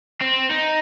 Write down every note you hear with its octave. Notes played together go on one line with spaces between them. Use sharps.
C4
D#4